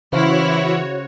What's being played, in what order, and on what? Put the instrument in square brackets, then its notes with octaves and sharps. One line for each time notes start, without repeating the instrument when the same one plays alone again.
[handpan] C#3 C5 F5 [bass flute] E3 [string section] E4 [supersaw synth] F#4 C#5